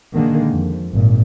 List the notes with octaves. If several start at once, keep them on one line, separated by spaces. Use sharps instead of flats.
A#2 D3 D#3 G#3 A#3
F2
G#1 A#2